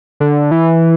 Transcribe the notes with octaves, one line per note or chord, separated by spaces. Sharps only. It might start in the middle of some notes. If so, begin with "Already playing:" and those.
D3
E3